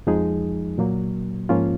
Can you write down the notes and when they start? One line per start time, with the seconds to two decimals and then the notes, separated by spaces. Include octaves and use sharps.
0.07 F2 F3 G#3 D#4 G#4
0.78 A#2 F#3 A#3
1.49 G#2 F3 A#3 C#4 F4